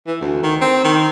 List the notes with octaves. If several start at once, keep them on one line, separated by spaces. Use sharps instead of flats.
E3
D2
D#3
C4
D#3